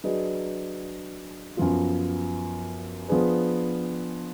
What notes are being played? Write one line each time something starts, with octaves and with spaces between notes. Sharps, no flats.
F#3 D4 G#4 B4 D#5
F#2 F3 B3 F4
F3 B3 D4 G#4 B4